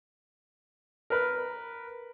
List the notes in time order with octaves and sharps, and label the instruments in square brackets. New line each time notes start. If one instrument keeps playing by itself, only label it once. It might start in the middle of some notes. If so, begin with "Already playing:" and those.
[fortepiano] A#4 B4